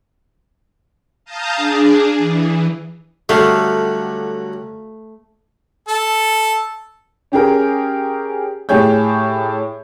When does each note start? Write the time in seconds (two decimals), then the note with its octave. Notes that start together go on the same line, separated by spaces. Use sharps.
1.25 F5 A5 A#5 D#6 G6
1.56 D4 G#4
2.17 E3
3.29 D3 F#3 G3 A3 F5
5.88 A4
7.32 C#4 G4 G#4 A#4
8.69 A2 G4 G#4 C#5 G6